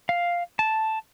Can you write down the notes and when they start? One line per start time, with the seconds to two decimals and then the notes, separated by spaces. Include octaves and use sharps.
0.09 F5
0.59 A5